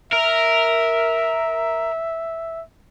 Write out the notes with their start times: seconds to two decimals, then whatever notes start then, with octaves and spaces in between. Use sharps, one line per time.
0.12 A#4 E5